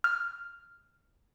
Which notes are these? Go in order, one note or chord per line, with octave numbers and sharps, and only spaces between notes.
F6